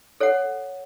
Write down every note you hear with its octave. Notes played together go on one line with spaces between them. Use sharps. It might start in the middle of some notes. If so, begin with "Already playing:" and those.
A4 C#5 F#5